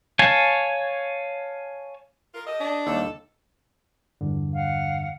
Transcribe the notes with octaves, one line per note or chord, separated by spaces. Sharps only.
C#5 F5 G#5 A5
F4 A#4
G4 A4 D#5
D4
D#2 G3 A4
E2 G2 D3
F5 F#5